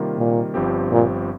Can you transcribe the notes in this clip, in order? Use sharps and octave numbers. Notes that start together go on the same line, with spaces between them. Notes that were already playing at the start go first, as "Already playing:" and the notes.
Already playing: C3 D#3 G3 A#3 F4
A#2
G1 G2 F3 C4 G4
A#2